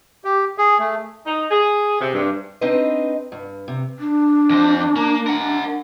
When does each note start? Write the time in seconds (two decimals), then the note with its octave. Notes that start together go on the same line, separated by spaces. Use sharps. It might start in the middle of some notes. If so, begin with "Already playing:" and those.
0.25 G4
0.58 G#4
0.79 A3
1.26 D#4
1.50 G#4
2.00 C3
2.14 G2
2.61 C4 D4 D#4 B4 C5 D#5
3.32 G2
3.68 C3
3.99 D4
4.50 F2 C5
4.96 A#3
5.27 A#4 F#5